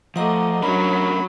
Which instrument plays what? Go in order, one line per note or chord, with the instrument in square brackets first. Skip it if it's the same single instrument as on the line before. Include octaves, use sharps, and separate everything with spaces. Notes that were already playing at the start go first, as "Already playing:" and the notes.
[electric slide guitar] F3 [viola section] A3 D#5 [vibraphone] F#5 A#5 D6
[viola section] F#3 [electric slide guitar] A3 C#4 A#4 [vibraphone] D4 [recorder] B5